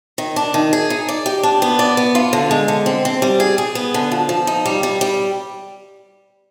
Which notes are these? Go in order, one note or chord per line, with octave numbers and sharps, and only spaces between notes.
D#3
D4
D#3
G#4
D#4
D5
G4
D4
B3
D5
B3
F4
D3
G#3
D3
C4
C4
G3
G#4
G#4
B3
D3
F3
F3
D#4
G3
G3
G3